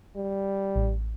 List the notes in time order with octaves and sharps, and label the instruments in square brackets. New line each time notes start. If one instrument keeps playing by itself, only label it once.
[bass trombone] G3
[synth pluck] A1